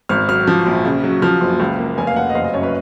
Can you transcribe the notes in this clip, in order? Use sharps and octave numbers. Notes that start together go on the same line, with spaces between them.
G#1 F6
F#3 F6
F3
A#1
C#3
F#3
F3 F6
F#1
C#2
A#3
F1 G#5
F5
F1 F#5
D#5
F#1 F5
D#5
F#2 C#5
B4